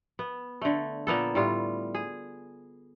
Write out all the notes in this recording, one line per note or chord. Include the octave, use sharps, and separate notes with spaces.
B3
D3 A3
A#2 A#3 B3 A4
A2 G3 F4
G#4